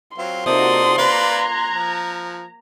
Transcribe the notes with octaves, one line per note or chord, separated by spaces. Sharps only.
F#3 C4 F4 C6
C3 A#3 D#4 F4 F#4 A4 D5 D#6
A#3 F4 B4 D5 A#5 F#6 G#6
F3